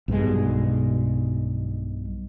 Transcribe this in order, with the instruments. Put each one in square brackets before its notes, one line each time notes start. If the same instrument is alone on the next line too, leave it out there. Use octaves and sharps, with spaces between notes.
[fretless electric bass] B1 G2 B2 G#3